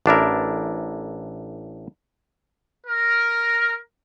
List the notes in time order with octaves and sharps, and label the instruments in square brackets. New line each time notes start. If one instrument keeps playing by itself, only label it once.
[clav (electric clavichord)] A1 D4 E4 A#4
[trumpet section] A#4